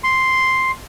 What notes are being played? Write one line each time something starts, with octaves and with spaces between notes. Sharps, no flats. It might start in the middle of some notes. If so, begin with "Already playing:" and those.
C6